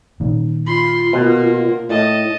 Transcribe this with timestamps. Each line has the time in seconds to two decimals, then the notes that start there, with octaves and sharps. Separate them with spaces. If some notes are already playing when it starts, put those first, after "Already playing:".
0.20 A#2 D#3
0.67 F4 B5 C6
1.13 B2 A#3
1.89 A2 D#5 A5